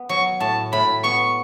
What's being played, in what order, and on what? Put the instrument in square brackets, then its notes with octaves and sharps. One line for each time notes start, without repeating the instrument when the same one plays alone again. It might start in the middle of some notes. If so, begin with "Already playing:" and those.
Already playing: [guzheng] B3
[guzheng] F#3 [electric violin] C#6
[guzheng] A2 [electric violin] A5
[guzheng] A2 [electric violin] B5
[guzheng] B3 [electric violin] C#6